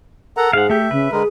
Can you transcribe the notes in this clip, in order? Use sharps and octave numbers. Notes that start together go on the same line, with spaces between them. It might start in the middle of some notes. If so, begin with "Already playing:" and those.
A4 A#4 F#5 A#5
G#2 G#4 F5 F#5
A3 G4 E5
C#3 B4
D3 G#3 G#4 A#4